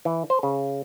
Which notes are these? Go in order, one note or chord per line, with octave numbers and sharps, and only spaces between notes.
E3
C5
C#3